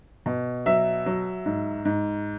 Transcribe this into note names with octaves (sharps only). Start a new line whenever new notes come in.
B2
F#3 E5
F#3
G#2
G#2